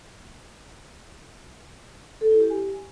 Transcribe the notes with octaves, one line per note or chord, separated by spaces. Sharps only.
A4
E4
G4
G#5